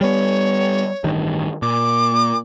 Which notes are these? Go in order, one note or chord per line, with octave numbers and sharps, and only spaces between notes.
G3 B3 C#5
A1 G2 D#3
A#2 D6